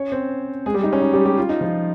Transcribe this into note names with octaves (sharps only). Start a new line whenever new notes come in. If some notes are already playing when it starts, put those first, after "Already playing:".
Already playing: C#4 C#5
C4 C5
G#3 G#4
G3 G4
D#4
C#4
D#4
G3 G4
G3 G4
F4
D#4
F3 F4